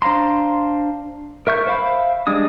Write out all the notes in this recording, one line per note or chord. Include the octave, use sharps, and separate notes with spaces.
D4 C5 F5 A#5 C6
A#4 E5 C#6 G6
C5 E5 F5 B5
G3 G#3 D4 D#6